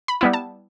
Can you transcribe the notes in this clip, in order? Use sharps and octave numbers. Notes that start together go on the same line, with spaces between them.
B5
G3 B3 E4
A5